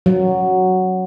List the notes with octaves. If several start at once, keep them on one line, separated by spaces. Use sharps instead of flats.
F#3